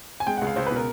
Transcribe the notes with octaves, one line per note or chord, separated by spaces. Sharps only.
G#5
G#3 G5
C#2 F#5
F5
C#2 C5
B2 B4
A#4